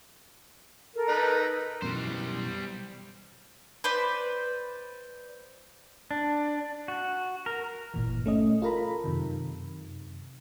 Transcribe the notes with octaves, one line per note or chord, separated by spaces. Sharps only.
A4 A#4
D#4 B4 A#5
F#2 B2 E3 G3 C5
B4 C5 D5
D4
F#4
A#4
G1 A#2 E3
A3 C#4 D#5
F4 A4 A#4 A#5 B5
F#2 C3 D#3